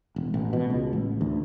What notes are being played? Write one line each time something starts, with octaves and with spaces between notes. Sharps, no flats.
E1
A1
B2
C#2
A1
D2